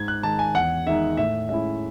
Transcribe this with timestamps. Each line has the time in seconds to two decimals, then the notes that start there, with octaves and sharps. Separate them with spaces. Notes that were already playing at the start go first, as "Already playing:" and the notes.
Already playing: G#2 G#6
0.08 F#6
0.23 D#3 G#3 D#4 A5
0.39 G#5
0.54 E2 F#5
0.86 D#3 G#3 D#4 E5
1.17 A2 E5
1.49 G#3 C#4 E4 E5